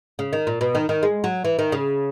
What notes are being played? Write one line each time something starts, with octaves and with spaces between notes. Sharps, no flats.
C#3
D#3
A#2
B2
D#3
D#3
G#3
F#3
E3
D#3
C#3